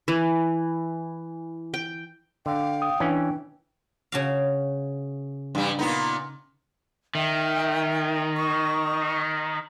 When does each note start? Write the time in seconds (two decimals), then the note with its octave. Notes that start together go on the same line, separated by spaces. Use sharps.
0.08 E3
1.74 G5
2.46 D3 F5 G5
2.82 D#6
3.00 E3 C#4 D4
4.12 C#3 F#4 F5
5.55 G2 G3
5.79 A#2 B3 D#4
7.15 D#3 E5 G5
8.37 C#6 D#6